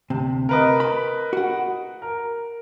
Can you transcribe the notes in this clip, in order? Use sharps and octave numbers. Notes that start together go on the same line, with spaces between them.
D2 C3
A#4 B4 D#5
B5
F#4 F#5
A#4